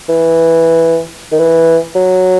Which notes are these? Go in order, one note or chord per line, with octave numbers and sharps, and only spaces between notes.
E3
D#3
E3
F#3